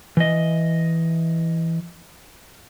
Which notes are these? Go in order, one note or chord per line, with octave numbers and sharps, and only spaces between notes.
E3 D#5